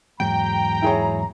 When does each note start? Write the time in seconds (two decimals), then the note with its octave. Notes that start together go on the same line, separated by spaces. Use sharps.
0.20 E2 G#2 F#3 G5 A#5
0.82 E4 G#4 C#5